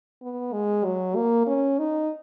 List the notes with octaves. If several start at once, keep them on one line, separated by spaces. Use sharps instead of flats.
B3
G#3
F#3
A#3
C#4
D#4